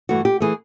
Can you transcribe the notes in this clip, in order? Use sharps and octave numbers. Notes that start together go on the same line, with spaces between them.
G2 E3 A3 F#4
G4
E3 A3 G#4